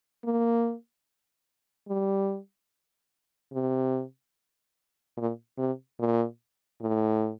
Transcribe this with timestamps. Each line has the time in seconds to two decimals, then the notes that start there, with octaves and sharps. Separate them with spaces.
0.25 A#3
1.89 G3
3.53 C3
5.17 A#2
5.58 C3
5.99 A#2
6.81 A2